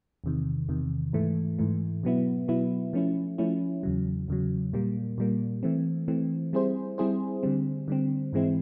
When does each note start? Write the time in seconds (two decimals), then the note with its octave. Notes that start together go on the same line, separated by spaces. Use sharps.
0.24 E2 C3 D#3
0.69 E2 C3 D#3
1.13 G#2 E3 A3
1.59 G#2 E3 A3
2.03 B2 F#3 B3 E4
2.48 B2 F#3 B3 E4
2.93 F3 A3 C#4 E4
3.38 F3 A3 C#4 E4
3.83 E2 C#3 F#3
4.28 E2 C#3 F#3
4.73 A#2 G3 A#3
5.18 A#2 G3 A#3
5.63 E3 A3 C4
6.08 E3 A3 C4
6.53 G3 C4 E4 G#4 C5
6.98 G3 C4 E4 G#4 C5
7.43 D3 G3 C4
7.88 D3 G3 C4
8.33 G#2 E3 G#3 C4 E4